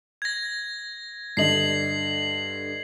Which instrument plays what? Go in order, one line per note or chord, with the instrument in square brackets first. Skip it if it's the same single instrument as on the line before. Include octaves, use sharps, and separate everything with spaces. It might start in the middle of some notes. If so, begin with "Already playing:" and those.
[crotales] G#6 A#6
[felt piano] G2 D3 D#5 [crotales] C7 F#7